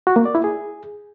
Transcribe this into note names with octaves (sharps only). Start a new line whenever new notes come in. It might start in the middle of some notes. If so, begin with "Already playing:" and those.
F#4
A#3
D5
E4
G#4